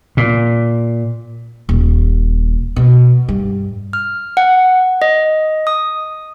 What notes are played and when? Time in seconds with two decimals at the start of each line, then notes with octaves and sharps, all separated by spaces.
0.17 A#2
1.69 D#1
2.76 B2
3.29 G2
3.93 F6
4.37 F#5
5.02 D#5
5.67 D#6